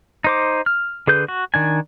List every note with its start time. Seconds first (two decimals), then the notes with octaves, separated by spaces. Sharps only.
0.24 D#4 C5 D6
0.66 F6
1.07 D3 G#4 B4 G6
1.28 F#4
1.54 D#3 D4 G#5